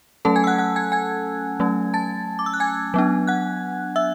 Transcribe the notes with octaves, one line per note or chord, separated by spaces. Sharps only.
F#3 A3 C#4 A4 A5
G#5 G#6
E6
F#5 F#6
F#5 F#6
G#5 G#6
G#5 G#6
F#3 A3 C#4
A5 A6
D6
E6
F#6
G#5 G#6
F#3 B3 D4
F#5 F#6
E5 E6